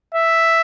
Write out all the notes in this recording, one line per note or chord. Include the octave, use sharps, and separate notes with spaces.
E5